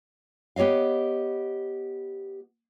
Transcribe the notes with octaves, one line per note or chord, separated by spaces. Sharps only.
B3 G4 C#5 D#5 F5